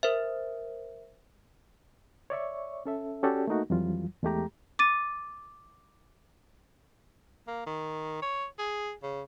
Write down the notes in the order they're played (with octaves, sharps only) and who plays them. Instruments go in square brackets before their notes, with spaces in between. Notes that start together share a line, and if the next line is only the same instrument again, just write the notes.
[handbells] A#4 C5 E5
[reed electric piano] C#5 D5 E5 C#6
C#4 A4 E5
C#4 F#4 G4 A4 D5
A3 A#3 D#4 F#4
F2 E3 F#3 G3 F4
E2 G#3 A3 G4 A#5
[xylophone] D6 A6 D#7
[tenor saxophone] A#3
D#3
C#5
G#4
C#3